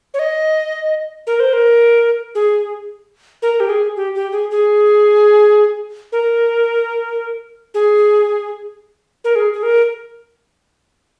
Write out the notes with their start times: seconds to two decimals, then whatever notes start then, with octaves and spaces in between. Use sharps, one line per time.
0.14 C#5
0.19 D#5
1.27 A#4
1.40 C5
1.53 A#4
2.35 G#4
3.42 A#4
3.60 G4
3.69 G#4
3.96 G4
4.15 G4
4.32 G#4
4.51 G#4
6.12 A#4
7.74 G#4
9.24 A#4
9.36 G#4
9.54 G#4
9.63 A#4